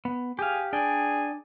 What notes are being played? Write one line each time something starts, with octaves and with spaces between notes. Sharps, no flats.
B3
G4 G#4 F5
D4 G#4 D5 G5